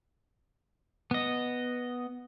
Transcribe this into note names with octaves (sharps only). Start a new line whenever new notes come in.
B3 D#5